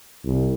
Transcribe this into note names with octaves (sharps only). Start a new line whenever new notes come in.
C2